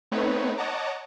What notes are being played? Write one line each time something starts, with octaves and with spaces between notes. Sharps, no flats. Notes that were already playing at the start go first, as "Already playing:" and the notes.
A3 B3 C4 D#4 B4 C#5
C#5 D#5 F#5 A5 A#5 D6